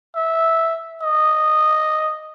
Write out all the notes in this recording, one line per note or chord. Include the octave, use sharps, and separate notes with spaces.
E5
D#5